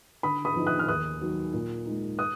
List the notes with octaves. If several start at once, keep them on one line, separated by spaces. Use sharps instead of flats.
D3 B5 D#6
B5 D#6
F3 B3 D#4
D#6 F#6
F6
D#2 D#6 F#6
D#3 F#3
A#2
G#3 D#4
D#6 F#6